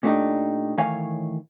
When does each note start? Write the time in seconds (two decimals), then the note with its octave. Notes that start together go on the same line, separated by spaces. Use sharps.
0.03 A#2 A3 B3 D4 D#4 G4
0.78 A2 D#3 E3 C#5 F5 G#5